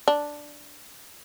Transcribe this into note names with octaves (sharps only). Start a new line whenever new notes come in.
D4